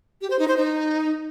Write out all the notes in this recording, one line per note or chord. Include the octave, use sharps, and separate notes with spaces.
G4
C5
D#4
C5
D#4